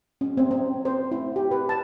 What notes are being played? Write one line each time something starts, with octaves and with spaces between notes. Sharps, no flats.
C#4
C4
C4
C5
E4
G4
B4
A5